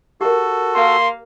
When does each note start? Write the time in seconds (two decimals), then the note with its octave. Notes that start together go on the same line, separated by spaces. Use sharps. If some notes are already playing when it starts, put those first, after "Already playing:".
0.21 F#4 G4 A4 A#4
0.75 A#3 F5 C6